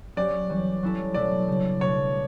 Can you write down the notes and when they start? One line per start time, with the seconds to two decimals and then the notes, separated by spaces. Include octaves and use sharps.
0.16 F#3 C#4 G4 D5
0.50 E3 G3 C#4
0.83 F#3 C#4 E4 A4
1.14 B2 F#3 A3 E4 A4 D5
1.47 C#3 G3 D4
1.80 B2 F#3 A3 C#5